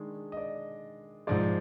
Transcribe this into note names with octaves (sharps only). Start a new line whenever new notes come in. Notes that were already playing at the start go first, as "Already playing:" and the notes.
Already playing: D#3 G#3 D4
D#5
D5
G#2 F3 G#3 D5